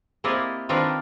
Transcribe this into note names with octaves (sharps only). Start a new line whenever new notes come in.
A#3 C4 E4 G4 D5 D#5
D#3 C4 D4 F4 A#4 B4